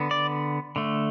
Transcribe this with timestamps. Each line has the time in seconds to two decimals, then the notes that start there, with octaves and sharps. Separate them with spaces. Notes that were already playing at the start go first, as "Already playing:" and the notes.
Already playing: D3 B3
0.11 D5
0.76 D3 A3